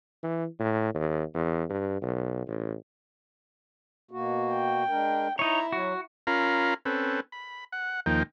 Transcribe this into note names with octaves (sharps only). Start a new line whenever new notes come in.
E3
A2
D#2
E2
G2
B1
A1
B2 A#3 F#4
G5
G#3 D4 A#4
D#4 E4 C#5 A#5
F#3 F#4
C#4 F4 A#4 F5 A#5 B5
C4 C#4 A4 B4
B5
F#5
D#2 F3 A#3 D#4 G5